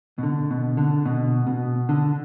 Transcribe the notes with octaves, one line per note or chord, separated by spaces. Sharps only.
B2
D3
B2
D3
B2
B2
D3